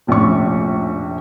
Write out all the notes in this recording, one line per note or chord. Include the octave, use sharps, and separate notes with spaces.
F1 A#1 A2 C#4 C#6